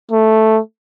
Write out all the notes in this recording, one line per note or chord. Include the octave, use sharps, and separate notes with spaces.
A3